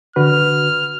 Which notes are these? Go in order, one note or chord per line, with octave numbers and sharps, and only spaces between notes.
D3 F#4 B4 F6